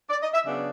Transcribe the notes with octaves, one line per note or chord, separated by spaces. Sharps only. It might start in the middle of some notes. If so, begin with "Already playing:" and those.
D5
D#5
E5
C#3 F#3 B3 D4